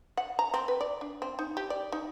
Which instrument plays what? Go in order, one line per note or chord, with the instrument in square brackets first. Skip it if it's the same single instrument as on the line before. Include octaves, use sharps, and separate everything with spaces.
[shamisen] F#5
A#5
C4
B4
D5
D4
C4
D#4
G4
D5
D#4